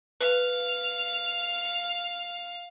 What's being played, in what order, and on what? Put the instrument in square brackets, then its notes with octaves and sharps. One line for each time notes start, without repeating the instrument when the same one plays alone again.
[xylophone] B4 [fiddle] F5